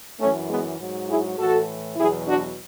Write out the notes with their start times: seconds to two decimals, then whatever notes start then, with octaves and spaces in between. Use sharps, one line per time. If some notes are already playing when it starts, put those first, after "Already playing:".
0.20 F#2 E3 A3 C#4
0.49 G#3 B3
0.79 G#2 F#3
1.08 E4 G#4
1.38 A2 E3 F#4 A4
1.96 E2 B2 F#3 E4 G#4
2.26 D4 F#4